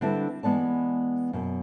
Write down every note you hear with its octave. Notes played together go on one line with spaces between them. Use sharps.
D3 G3 C4 D4 E4 B4
E3 G#3 B3 D5 A5
F#2 B2